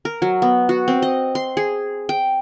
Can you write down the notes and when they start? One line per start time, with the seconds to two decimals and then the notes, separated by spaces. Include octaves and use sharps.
0.05 A#4
0.22 F#3
0.42 B3
0.69 F#4
0.88 C4
1.02 D#5
1.35 C6
1.57 G#4
2.09 G5